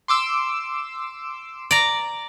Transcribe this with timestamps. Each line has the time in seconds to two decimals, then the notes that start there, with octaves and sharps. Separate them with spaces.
0.08 C6 D6 E6
1.71 D5 A#5